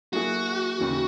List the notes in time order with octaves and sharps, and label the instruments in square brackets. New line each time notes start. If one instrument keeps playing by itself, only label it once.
[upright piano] F#3 A#3 E4 G#4 [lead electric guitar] F#4
[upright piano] D#2 C#3 E3